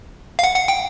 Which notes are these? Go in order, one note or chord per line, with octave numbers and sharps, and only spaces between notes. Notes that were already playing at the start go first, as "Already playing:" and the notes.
F5
F#5
F#5
G5